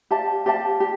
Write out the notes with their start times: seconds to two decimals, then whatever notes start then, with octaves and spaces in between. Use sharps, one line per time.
0.11 G4 D5 F5 A5
0.46 G4 D5 F5 A5
0.80 G4